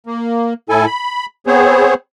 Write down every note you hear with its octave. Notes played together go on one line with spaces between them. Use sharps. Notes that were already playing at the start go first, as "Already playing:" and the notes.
A#3
A2 E4 A4 G#5
B5
B3 C4 G#4 C5 C#5